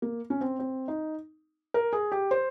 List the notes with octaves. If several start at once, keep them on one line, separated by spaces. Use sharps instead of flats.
A#3
C#4
C4
C4
D#4
A#4
G#4
G4
C5